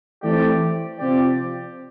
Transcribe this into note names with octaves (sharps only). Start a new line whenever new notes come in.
E3 A3 C4 G4 D5
C3 F3 C4 G4 D5